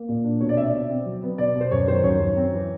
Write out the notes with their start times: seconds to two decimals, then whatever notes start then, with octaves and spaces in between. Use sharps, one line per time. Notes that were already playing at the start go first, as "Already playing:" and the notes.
Already playing: A#3
0.09 A#2
0.24 D4
0.40 B2 C#5
0.49 D5
0.57 C4 E5
0.66 D5
0.73 B2
0.90 C4
1.06 F#3
1.23 B3
1.38 B2 D5
1.55 B2
1.61 C5
1.71 F#2 C#5
1.87 D#3 C5
2.04 F#2 C#5
2.20 F#2
2.37 C4
2.53 E3